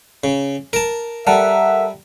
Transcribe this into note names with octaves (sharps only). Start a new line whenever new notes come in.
C#3
A#4 A5
G3 A4 A#4 E5 F#5